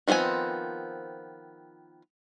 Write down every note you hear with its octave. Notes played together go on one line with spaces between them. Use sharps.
D#3 F3 B3 C4 G#5